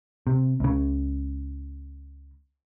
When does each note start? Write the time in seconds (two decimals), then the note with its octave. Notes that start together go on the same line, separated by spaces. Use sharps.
0.27 C3
0.60 C#2 C#3